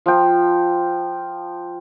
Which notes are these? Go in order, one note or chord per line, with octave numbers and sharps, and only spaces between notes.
F3 G5